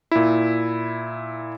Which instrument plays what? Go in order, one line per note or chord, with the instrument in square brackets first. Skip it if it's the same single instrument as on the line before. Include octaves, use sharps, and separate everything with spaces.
[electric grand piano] A#2 E4